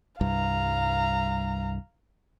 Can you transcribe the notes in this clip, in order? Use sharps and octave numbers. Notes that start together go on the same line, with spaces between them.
C2 G2 F5 A#5